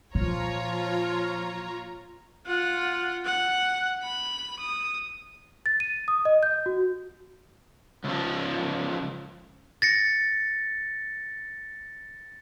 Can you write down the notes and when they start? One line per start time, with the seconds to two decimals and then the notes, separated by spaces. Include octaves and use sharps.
0.15 A#2 F3 F4 C#5 A#5
2.46 F4 F#5
3.26 F#5
4.03 B5
4.60 D#6
5.66 A6
5.80 D#7
6.08 D#6
6.25 D#5
6.43 G6
6.66 F#4
8.05 C#2 F3
9.82 A6 A#6 C#7